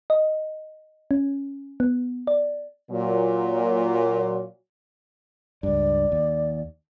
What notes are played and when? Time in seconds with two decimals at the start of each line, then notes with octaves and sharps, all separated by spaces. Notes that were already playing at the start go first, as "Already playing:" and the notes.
0.10 D#5
1.11 C#4
1.80 B3
2.27 D5
2.90 A#2 F#3
5.63 C#2 G2 D5
6.12 D#2